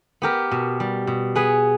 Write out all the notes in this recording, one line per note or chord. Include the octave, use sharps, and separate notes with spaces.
B3 G4 A#4
B2
G3
B2
B3 G#4 B4